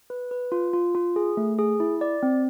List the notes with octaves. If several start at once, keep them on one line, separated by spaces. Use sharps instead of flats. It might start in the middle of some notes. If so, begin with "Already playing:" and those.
B4
B4
F4
F4
F4
G#4
A3
G#4
E4
D5
C4